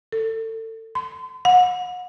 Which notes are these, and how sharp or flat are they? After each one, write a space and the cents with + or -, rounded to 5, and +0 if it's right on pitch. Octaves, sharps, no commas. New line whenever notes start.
A4 +30
C6 -35
F#5 -35